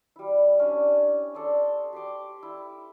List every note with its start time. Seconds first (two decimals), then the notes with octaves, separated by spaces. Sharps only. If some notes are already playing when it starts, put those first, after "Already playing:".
0.16 G3 E4
0.59 C#4 D4 G4
1.34 A4 D5 C6 D#6
1.93 G4 C6 D6
2.43 E4